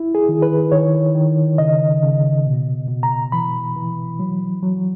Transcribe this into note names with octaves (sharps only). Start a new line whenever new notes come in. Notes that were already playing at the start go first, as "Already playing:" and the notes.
Already playing: E4
G#4
D#3
B4
D#3 C#5
D#3
C#3 D#5
C#3
B2
B2
A#5
E3 B5
E3
F#3
F#3